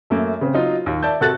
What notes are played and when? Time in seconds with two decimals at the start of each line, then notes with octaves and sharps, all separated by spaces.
0.10 F#2 A3 A#3
0.41 C#3 C4
0.54 F#3 D#4 F4
0.86 D#2
1.03 D5 E5 A5 G6
1.21 C3 F#4 A4 F#6 A6